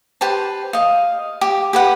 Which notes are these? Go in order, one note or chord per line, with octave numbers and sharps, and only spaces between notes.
G4 B4 C5 A5
D#5 F5
G4
G4 B4 F#5